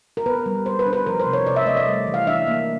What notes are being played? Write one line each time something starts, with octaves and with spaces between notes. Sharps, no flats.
A#4
B3 B4
G3
G3 C5
B4
D4
B4
F3 A#4
C5
C3
C#5
C3 D5
E5
A3 D#5
D5
G3
E3
F5
D4 E5
A#3